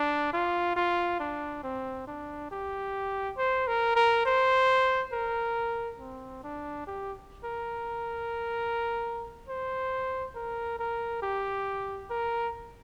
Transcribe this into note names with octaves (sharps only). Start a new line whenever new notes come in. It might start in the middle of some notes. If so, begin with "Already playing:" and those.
Already playing: D4
F4
F4
D4
C4
D4
G4
C5
A#4
A#4
C5
A#4
C4
D4
G4
A#4
C5
A#4
A#4
G4
A#4